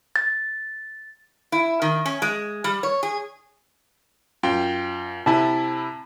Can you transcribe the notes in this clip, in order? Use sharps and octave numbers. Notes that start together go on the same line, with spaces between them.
A6
E4
D#3
C#4
G#3
G3
C#5
G#4
F#2 F4 G5
C3 E4 G#5 A5 B5